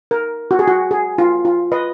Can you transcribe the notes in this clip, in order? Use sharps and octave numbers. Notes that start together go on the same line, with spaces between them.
A#4
F#4
G#4
F#4
G#4
F4
F4
B4 D#5